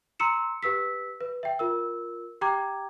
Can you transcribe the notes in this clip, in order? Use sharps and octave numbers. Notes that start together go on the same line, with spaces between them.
A#5 C6 E6 C#7 E7
G4 B4 E6 B6
B4
E5 G5
F4 A#4 E6
G4 G5 A#5 D6 G#6